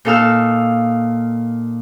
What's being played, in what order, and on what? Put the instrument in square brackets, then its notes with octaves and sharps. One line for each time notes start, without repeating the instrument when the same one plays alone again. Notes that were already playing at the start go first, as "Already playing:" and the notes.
[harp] A#2 D#4 A4 F5 E6 F6